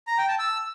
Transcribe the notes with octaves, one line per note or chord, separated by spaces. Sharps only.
A#5
G5
A5
E6